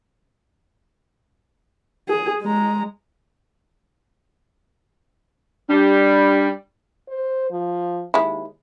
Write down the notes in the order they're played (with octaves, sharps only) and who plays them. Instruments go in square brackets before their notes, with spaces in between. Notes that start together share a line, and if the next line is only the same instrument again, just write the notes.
[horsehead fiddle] G#4
G#3 A#5
[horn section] G3 [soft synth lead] D4
[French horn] C5
F3
[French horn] D#2 [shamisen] G#3 E4